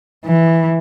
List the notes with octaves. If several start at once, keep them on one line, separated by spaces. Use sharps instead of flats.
E3